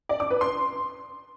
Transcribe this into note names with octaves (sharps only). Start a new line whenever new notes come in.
D5
D6
B4
C6